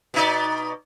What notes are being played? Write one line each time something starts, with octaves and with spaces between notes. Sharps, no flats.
B2 D#4 D5